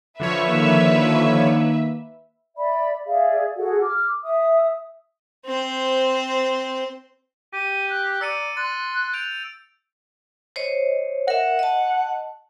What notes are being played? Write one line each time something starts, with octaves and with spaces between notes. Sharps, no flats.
D3 F3 B4 C#5 E5
D#3 A#3
D5 E5 B5
G#4 D5 E5 F5
F#4 G#4 A4 F#5
D6 F6
E5 D#6
C4 C5
G4 D#7
F#6
D5 A#5 E6 C#7 D#7
C6 F#6 A6
G6 D7 F7
C5 C#5 D#5
A#4 E5 F#5
D#5 A5